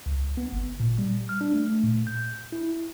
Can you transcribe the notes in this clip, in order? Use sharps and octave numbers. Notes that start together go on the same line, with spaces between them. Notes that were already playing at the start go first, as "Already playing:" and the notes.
C#2
B3
G1
A#2
G3
F6
D4
A3
A#2
G6
E4